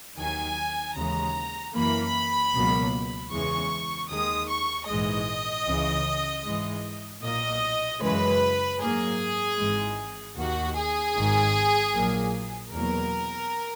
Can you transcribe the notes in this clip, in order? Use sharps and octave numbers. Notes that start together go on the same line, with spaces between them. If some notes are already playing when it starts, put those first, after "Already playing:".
D#2 D#3 F#3 G#5
D#2 C#3 E3 G#3 A#5
F#2 E3 A#3 B5
C#2 B2 F#3 A#3
E2 C#3 E3 G#3 C#6
D#2 D#3 G#3 D#6
C#6
A#1 G#2 E3 G#3 D#5
C#2 C#3 E3
G#2 E3 G#3
B1 A#2 A#3 D#5
F#2 C#3 E3 G#3 B4
G#2 F#3 A#3 G#4
G#1 G#2 E3 G#3
D#2 D#3 A#3 F#4
G#4
G#1 G#2 D#3
A#1 A#2 F#3 A#3
E2 B2 F#3 A#3 A#4